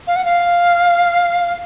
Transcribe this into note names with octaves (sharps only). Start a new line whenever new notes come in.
F5
F#5
F5